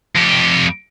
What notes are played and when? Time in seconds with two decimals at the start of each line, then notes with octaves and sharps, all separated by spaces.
0.15 F2 G4